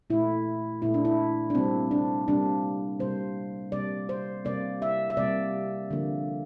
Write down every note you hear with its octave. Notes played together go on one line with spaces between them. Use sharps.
A#2 A3 E4
A#2 A3 E4
D4
E4
D4
C3 G3 A#3 C4
D4
C3 G3 A#3 D4
C3 G3 A#3 C5
C3 G3 A#3 D5
C5
C3 G3 A#3 D5
E5
E5
C3 G3 A#3 D5
D3 F3 A#3